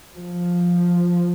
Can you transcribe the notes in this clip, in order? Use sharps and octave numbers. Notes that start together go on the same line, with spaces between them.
F3